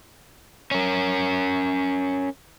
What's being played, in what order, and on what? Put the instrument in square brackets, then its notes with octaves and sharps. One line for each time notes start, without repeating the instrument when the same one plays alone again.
[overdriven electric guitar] C#4 A#4